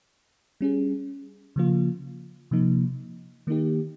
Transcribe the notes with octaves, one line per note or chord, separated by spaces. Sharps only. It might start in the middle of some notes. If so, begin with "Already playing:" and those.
G3 C#4 G#4
C#3 F3 A#3 F4
C3 F3 A#3 D#4
D#3 A#3 D#4 G4